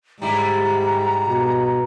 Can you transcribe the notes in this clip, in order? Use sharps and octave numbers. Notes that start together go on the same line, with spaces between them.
G#2 G3 E4 A#5
B2